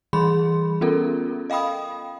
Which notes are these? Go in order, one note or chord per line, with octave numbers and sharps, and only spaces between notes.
E3 G3 G#4 B5 C6
B3 C#4 F4 A4 A#4
D#5 F5 G5 B5 D#6